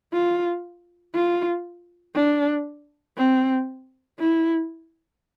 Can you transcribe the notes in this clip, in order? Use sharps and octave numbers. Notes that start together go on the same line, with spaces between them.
F4
F4
D4
C4
E4